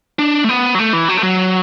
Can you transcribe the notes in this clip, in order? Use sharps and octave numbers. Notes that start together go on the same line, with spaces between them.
D4
A3
B3
F#3
A3
E3
F#3
A3
F#3